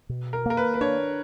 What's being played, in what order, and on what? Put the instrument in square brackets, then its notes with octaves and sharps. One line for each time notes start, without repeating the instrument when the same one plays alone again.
[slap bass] B2
[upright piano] A#4
[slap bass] A#3 [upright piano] A#4
[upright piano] B4
B4
[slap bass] D4 [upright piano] C#5